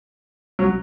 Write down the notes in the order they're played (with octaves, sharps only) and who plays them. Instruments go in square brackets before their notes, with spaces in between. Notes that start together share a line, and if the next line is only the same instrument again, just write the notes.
[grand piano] F#3